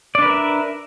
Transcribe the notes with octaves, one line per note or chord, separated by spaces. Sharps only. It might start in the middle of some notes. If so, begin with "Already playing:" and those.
D4 A#4 B4 D5 E5